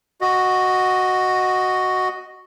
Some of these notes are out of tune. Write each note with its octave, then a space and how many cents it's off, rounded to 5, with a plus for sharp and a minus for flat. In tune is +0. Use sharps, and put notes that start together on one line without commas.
F#4 +0 D#5 +0